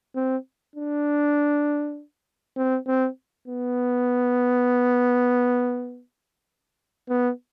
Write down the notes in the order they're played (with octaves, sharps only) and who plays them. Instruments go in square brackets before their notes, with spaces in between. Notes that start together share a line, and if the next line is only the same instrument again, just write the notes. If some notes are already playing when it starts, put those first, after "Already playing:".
[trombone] C4
D4
C4
C4
B3
B3